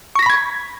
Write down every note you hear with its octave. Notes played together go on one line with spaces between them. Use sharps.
B5 C#6 G#6 A#6 B6